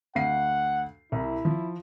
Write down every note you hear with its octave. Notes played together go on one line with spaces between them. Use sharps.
D2 F5 F#5 C7
C2 E4
F3